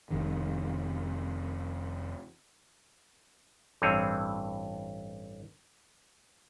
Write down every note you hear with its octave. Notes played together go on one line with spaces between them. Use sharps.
F1 F2 D#3
A1 G2 E3 C4 G#4 C#5